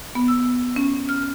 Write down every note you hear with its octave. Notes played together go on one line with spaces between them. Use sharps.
B3
E6
C#4
F6